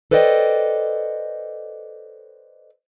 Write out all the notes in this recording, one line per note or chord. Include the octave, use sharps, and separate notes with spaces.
A4 B4 C5 D5 D#5 G5